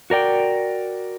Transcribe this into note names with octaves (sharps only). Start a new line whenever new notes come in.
F#4 A#4 D5 G5